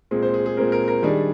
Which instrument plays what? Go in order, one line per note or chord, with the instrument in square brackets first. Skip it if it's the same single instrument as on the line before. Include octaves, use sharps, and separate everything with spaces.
[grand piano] A#2 G#3 C4 G#4
C5
G#4
G#4
A#2 G#3 C4 A#4
A#4
A#4
D#3 G3 D4 G#4